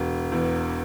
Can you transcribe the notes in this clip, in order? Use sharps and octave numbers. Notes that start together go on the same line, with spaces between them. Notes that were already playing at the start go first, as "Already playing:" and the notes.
Already playing: E1
E2